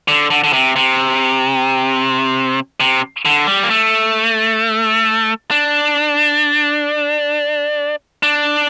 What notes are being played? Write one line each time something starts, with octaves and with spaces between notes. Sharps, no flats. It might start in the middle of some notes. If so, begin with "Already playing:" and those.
D3
D3
D3
C3
C3
C3
D3
G3
A#3
A3
D4
D4